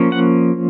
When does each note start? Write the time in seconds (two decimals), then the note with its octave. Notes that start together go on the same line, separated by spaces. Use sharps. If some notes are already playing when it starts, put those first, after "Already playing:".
Already playing: F3 A#3 C#4
0.12 F#5